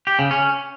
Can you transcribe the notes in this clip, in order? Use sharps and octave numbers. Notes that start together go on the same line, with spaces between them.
G4
C#3
C#4